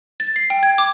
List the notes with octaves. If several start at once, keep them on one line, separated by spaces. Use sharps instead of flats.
A6
C7
G5
G#6
D6